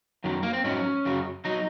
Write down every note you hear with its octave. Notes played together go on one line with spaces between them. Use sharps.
F#2 D#3 F#3
A#3
C4
G#2 F#3 C#4
F#2 C#3 F#3
F#3 D#4